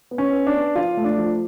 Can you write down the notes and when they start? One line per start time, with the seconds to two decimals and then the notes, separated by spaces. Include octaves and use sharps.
0.11 B3
0.18 C#4
0.33 B4
0.47 D4
0.54 B3
0.75 F3 F4
0.97 A3
1.04 D4
1.18 F3